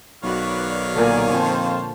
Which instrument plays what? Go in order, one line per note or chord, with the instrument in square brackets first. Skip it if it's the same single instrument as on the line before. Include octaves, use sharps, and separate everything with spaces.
[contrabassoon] B1 [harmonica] D#3 C#5 F5 [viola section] F#4 B4 D5
[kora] A#2 D3 [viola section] D5 G#5 A#5
[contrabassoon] F2 [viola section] C5 A5